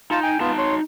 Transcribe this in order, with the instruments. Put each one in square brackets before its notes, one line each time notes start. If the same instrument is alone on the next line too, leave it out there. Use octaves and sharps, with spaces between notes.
[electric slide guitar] D#4 [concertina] F4 A5
[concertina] G5 G#5
[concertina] B3 F4 [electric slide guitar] D#4 A5
[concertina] C#5 C6